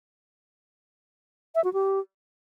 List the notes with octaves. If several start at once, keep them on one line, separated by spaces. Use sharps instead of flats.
E5
F#4
G4